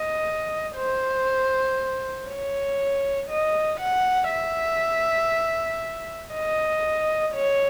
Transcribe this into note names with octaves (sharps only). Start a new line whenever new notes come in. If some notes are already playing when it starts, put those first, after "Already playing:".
Already playing: D#5
C5
C#5
D#5
F#5
E5
D#5
C#5